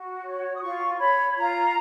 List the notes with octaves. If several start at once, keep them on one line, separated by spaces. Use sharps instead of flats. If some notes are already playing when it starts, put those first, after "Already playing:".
Already playing: F#4
C#5
D#6
F4 C#6
C#5 B5
F4 A#5